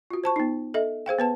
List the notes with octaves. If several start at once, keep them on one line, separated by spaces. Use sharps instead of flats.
F4 F#4
C5 A5 C#6
B3 D#4
A4 D#5 E5
G#4 C5 F5 G5
B3 B4 A5